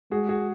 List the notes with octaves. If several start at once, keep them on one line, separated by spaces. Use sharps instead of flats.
G#3 F#4 G#4
F#4 G#4